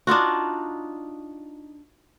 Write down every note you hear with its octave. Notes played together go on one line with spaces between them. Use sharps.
D4 D#4 F4 F#4